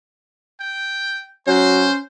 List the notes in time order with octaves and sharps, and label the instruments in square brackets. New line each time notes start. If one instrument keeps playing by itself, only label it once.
[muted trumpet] G5
[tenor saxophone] F#3 [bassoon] C#4 [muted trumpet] C5